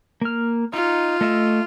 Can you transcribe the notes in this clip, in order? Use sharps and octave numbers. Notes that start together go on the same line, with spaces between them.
A#3 F6
D#4 F4
A3 D#5 E5